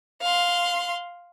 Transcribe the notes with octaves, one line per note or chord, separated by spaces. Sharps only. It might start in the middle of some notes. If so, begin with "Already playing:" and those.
F5 C6